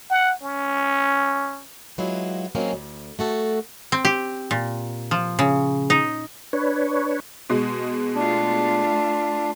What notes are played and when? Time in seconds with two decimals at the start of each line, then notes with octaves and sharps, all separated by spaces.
0.10 F#5
0.43 C#4
1.98 F#3 G#3 B3 E4 F4
2.55 F#3 G#3 A#3 C4 C#4 F4
2.73 D2
3.19 A3 F#4 A4
3.92 C4
4.05 G4
4.51 A#2
5.11 F3
5.39 C#3
5.90 D#4
6.53 D4 B4 C#5
7.50 B2 G#3
8.15 A3 D4 F4